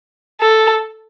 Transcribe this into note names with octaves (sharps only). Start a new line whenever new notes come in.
A4